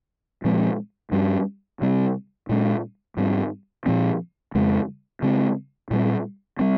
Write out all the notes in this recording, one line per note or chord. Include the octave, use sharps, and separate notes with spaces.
A#2 F3 G#3 C4
G2 G3 C#4
C3 G3 C4
A#2 G#3 C#4
G#2 G3 C4
A#2 F3 C4
F2 C#3 G#3
C#3 G#3 C4
A#2 G3 C4
G3 C4